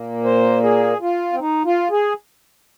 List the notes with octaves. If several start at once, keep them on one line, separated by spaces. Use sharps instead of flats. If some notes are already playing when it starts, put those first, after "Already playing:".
Already playing: A#2 A#3
C5
G#4
F4
C4
D#4
F4
G#4